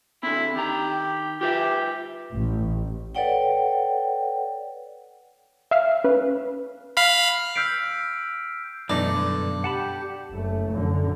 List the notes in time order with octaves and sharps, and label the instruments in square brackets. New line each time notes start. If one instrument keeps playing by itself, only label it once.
[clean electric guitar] D3 C4 [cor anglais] E4
[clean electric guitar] D#3 A#5 [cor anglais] G4
[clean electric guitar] F4 B4 E5 [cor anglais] G4
[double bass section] A1
[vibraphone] A4 B4 C#5 D5 F#5 G5
[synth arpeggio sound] E5 F5 F6
C#4 B4
[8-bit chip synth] F5 B5
[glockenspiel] E6 F6 G6 B6 C7 D7
[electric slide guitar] F#2 B2 [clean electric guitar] E3 A3 D#4 [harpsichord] D4
[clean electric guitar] G2 D3
[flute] G4 [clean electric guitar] F#5 A5 B5
[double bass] F#1 A3
F#2 D3